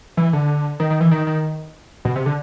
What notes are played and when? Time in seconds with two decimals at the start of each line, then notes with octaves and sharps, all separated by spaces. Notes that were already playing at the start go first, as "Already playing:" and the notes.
0.17 E3
0.33 D3
0.80 D#3
0.90 D#3
1.00 E3
1.11 D#3
1.27 D#3
2.05 B2
2.16 C3
2.26 D3